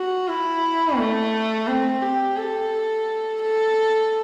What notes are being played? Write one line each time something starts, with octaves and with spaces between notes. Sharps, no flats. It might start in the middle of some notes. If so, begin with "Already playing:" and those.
Already playing: F#4
E4
A3
C4
G4
A4
A4